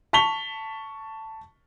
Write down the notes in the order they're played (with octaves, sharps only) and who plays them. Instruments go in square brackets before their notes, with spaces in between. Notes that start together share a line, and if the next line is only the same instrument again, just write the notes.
[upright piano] A5 C#6 B6 F7 G7